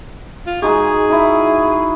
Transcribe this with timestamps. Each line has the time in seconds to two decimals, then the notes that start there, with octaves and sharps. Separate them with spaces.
0.46 F4
0.62 G#3 D#4 F#4 G#4
1.10 D#4 E4